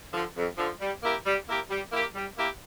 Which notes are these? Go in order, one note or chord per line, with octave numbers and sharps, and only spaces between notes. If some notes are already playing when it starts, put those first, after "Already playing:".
D3 F3
F2
D3 F3
G3
A#3 E4 G4 A#4
G3
A#3 E4 G4 A#4
G3
A#3 E4 G4 A#4
G3
A#3 E4 G4 A#4